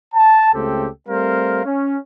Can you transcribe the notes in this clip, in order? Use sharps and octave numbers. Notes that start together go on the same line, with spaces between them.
A5
C#2 C#3 A3 C4 G4 A4
G3 A3 C4 A#4 C5 F5
C#4